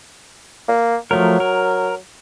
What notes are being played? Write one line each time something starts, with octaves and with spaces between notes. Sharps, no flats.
A#3
F3 F#3 A3 A#4
A#4